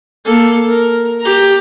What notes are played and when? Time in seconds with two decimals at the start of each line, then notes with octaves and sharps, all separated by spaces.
0.25 A#3 A4
0.68 A#4
1.21 G4 A#5